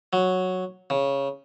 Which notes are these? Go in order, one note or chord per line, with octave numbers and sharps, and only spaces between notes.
F#3
C#3